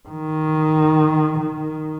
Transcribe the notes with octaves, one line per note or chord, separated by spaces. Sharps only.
D#3
D#3